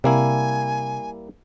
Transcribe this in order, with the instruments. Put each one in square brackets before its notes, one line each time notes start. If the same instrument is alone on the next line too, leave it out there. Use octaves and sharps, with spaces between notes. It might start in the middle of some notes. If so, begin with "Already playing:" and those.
[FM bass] C3 [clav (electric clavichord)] G3 A#3 E4 [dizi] G#5